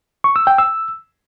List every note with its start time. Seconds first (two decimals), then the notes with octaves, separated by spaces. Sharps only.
0.24 C#6
0.36 E6
0.47 G5
0.58 E6